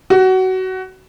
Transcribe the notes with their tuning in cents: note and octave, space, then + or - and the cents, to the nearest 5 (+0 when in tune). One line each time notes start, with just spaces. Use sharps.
F#4 +20